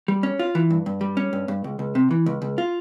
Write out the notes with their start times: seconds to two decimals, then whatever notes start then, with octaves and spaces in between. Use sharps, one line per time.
0.08 G3
0.23 C#4
0.39 F4
0.55 E3
0.70 G2
0.86 G2
1.01 G3
1.17 C#4
1.33 G2
1.48 G2
1.64 C#2
1.79 C#2
1.95 C3
2.11 E3
2.26 C#2
2.42 C#2
2.58 F4